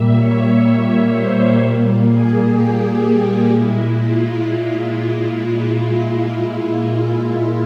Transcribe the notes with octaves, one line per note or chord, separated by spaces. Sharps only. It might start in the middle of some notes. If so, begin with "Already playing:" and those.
Already playing: A#2 G3 A#3 E5
C#5
C#5
C5
A#2 G3 A#3
G#4
G4
A#2 G#3 E4
F4